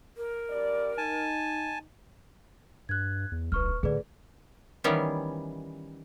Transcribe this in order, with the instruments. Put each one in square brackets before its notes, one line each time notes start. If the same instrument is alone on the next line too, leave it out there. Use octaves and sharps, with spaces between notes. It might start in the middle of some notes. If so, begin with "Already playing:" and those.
[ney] A#4
[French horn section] G2 G3 D5
[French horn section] D#4 [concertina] G#5 A5
[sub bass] G2 [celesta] F#6 G#6
[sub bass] E2
[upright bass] D1 [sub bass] B1 [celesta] B4 C#6 F6
[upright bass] A2 [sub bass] D3 [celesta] G#4 B4 D5
[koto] D#3 E3 G3 B3 C#4